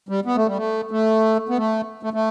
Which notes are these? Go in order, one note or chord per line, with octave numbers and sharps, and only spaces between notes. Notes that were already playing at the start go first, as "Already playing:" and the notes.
G3
B3
A3
G3
A3
A3
B3
A3
A3
A3